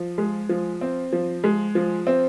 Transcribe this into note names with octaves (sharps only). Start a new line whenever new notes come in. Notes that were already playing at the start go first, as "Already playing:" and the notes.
Already playing: F3
G#3
F3
C4
F3
G#3
F3
C4